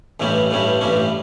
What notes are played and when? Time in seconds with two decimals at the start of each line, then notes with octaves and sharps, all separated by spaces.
0.20 A1 G2 E3 G3 C#4
0.51 A1 G2 E3 G3 C#4
0.81 A1 G2 E3 G3 C#4